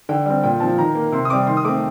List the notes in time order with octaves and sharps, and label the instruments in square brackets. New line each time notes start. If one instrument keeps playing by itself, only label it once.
[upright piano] D3 G5
G3 C4
A#2 G5
F3 C4 A5
D#3 A#5
A#3
C3 C6
D#6
G3 C4 D6
D#3 C6
D#6
A3 C4 D6